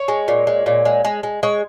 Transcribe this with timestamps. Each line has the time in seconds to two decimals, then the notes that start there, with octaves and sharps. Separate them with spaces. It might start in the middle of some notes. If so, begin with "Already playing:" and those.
Already playing: C#5
0.08 G#3
0.28 A#2
0.47 G#3
0.66 A#2
0.85 G#3
1.05 G#3
1.23 G#3
1.43 G#3 C#5